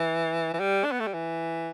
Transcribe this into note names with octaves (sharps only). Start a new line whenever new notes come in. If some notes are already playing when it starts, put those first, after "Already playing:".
Already playing: E3
E3
G3
D4
B3
A3
G3
E3